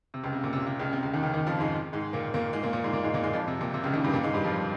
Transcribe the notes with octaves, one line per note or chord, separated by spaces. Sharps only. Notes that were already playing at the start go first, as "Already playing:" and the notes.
C3
C#2 C#3
C3
A#2
C3
C3
C#2 C#3
C3
C#2 C#3
D#2 D#3
C#2 C#3
D#2 D#3
F2 F3
G#2 G#3
G#2 G#3
A#2 A#3
A#2 A#3
G#2 G#3
A#2 A#3
A#2 A#3
G#2 G#3
A#2 A#3
G#2 G#3
A#2 A#3
G#2 G#3
F2 F3
C3
A#2
C3
C#2 C#3
D#2 D#3
G2 G3
A#2 A#3
G#2 G#3
G2 G3
F2 F3